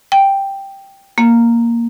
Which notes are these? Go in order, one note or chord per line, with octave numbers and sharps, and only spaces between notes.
G5
A#3